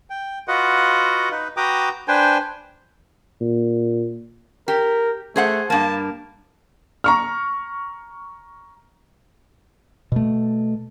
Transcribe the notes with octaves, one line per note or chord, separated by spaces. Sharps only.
G5
F4 F#4 B4 D#5 F#5
D#4 B4
F#4 B4 G5 A#5 D6 D#6
D4 B4 C5 G5 G#5
A#2
G4 A#4
A3 G#4 C5 F#5
G2 A#3 A5
A#5 C#6 F6
B2 A3